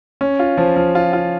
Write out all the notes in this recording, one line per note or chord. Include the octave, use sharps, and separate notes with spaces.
C#4
F4
F3
F3
F4
F4